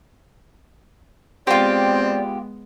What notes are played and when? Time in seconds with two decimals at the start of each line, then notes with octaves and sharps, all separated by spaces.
1.47 G#3 B3 C4 F4 G4 D5